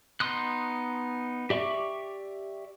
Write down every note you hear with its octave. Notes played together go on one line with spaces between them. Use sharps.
B3 D#4 C6 D#6 F#6
G4 D5 E5 C#6 D6